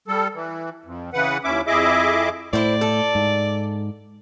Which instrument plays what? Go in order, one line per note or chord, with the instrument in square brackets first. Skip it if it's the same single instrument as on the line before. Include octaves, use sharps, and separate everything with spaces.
[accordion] G3 A4
E3
F2
C#3 E3 B4 F#5
D#2 C#4 E4 E5 D6
F2 E4 G#4 D#5 E5 D6
[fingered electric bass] A2 [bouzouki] E4 C5 [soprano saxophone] D5
[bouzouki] A4
[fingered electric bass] G#2